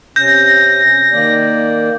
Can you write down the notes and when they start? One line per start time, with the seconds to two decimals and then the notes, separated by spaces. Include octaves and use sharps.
0.16 C3 C#4 G6 A#6
1.12 D#3 A#3 D5